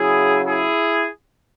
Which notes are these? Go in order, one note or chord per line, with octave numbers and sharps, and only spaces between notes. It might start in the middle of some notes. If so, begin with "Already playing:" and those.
Already playing: C#3 F#3 E4 G#4
E4 G#4